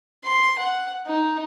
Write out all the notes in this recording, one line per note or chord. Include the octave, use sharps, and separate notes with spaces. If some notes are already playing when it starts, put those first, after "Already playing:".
C6
F#5
D#4